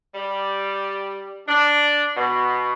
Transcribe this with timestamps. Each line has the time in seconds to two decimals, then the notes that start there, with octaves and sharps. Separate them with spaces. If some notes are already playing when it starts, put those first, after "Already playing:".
0.15 G3
1.48 D4
2.17 B2